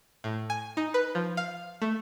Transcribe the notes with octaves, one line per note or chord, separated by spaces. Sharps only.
A2
G#5
D#4
B4
F3
F5
A3